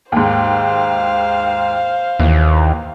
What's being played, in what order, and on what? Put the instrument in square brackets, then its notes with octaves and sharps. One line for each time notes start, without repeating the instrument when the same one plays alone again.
[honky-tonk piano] D#2 G#2 [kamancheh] C5 F5
[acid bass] D#2 [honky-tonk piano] E3